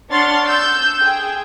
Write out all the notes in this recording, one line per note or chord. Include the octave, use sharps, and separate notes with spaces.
D4 C#5 F#5 C6 F6 A6
E6 G6
G#4 G5